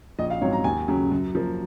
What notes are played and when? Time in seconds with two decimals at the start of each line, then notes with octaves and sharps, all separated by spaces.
0.19 A#1 D#5
0.30 F5
0.41 G#2 F#3 C4 C#5
0.53 A#5
0.64 D#2 G#5
0.88 C#3 F#3
1.12 F#2
1.35 F3 A#3